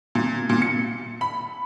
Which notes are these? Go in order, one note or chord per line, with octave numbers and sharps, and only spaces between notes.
A#2
A#2
C#7
B5